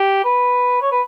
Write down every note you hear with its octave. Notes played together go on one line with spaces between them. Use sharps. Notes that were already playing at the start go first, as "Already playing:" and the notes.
Already playing: G4
B4
C#5
B4